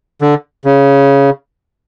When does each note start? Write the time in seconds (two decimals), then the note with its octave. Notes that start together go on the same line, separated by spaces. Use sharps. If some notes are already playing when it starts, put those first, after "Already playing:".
0.21 D3
0.65 C#3